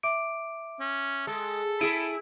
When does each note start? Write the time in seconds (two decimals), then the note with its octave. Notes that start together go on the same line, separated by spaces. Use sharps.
0.03 E5 D6 D7
0.80 C#4
1.27 G#3 A4
1.81 E4 G#4 D7 D#7